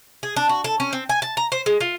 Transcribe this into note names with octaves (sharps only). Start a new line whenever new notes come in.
G#4
D4
F#4
A4
C#4
C4
G#5
A5
A#5
C5
G#3
F4